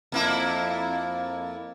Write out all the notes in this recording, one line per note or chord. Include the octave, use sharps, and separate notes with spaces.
F2 A#3 E4